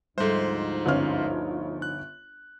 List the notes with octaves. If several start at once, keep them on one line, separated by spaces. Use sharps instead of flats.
D2 G#2 F3 G3 D#4 A4 C5
G1 C#4 F6
F#6